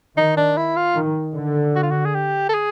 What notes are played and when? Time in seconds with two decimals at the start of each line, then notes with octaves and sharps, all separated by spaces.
0.17 D#3 D#4
0.37 D4
0.57 E4
0.76 F4
0.96 D#3
1.36 D3
1.76 F#4
1.83 F4
1.91 F#4
2.05 G#4
2.15 G4
2.49 A4
2.54 G#4